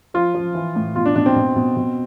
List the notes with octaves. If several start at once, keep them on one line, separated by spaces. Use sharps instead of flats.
F3 F4
F3
E3
A2
B2 F4
D4
B2 D4
C4
B2
B2
B2